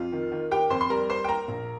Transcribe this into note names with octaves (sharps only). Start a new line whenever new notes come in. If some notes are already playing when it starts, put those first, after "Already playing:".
Already playing: F2 F4
D#3
D#3
A#3 G4 G5
F2 C5 C6
C6
G3 A#4 A#5
A#3 C5 C6
G5
A#3 A#4 A#5
A#1